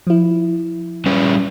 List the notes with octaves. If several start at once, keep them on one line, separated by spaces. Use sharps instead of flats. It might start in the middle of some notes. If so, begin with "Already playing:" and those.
F3 E4
G3 C#4 B4